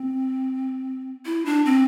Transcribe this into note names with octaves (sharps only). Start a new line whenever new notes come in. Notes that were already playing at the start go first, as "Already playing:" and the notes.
Already playing: C4
E4
D4
C4